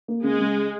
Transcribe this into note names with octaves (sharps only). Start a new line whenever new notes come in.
A#3
C#3 G#3
C#3